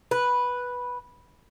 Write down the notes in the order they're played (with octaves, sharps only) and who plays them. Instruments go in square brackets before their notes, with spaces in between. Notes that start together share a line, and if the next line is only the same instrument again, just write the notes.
[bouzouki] B4